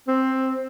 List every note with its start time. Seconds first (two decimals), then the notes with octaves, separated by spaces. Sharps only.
0.08 C4